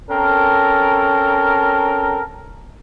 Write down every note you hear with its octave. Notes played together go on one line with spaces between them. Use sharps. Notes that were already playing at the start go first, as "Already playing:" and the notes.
C4 C#4 A4 A#4